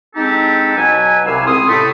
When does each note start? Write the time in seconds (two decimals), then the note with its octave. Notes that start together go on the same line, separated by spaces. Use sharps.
0.15 G#3 C4 D4 D#4 G4 A4
0.77 B2 F#3 B4 G#5
1.24 C2 C3 E4 F5 G#5 E6
1.46 C#2 C4 E4 C6 D#6
1.68 A2 C3 A3